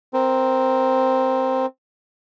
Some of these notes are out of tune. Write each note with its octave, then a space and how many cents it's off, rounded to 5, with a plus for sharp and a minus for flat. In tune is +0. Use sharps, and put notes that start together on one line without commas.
C4 +0 A#4 +0